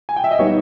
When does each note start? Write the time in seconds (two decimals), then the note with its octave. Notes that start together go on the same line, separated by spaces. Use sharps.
0.09 G#5
0.16 G5
0.24 E5
0.31 D#5
0.39 G3 B3 D#4 C#5